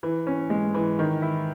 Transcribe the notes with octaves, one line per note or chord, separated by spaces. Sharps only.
E3
C#4
G#3
E3
D#3
E4